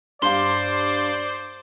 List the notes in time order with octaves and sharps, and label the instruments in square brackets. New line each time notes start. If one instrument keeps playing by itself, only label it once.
[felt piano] G2 F5 [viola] C5 D6 [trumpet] D5 [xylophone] C6